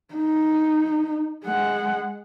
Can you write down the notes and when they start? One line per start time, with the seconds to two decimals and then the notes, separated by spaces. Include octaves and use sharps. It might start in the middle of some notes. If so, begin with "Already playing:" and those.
0.14 D#4
1.45 G#3 F#5